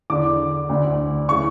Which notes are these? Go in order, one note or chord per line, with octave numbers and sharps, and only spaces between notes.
E2 D3 D6
D2 D3
C#3 E3 C#6